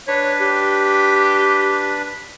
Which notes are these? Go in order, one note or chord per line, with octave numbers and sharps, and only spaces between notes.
D4 B4 C#5
G4